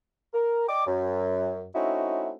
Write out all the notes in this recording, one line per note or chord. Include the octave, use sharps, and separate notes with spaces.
A#4
D5 D#5 G5 D6
F#2
A3 C4 C#4 D#4 E4 F#4